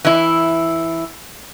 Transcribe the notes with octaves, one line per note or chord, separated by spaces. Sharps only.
E3 E4